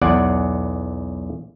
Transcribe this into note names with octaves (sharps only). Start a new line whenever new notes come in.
B1 E2 D5 F#5 G#5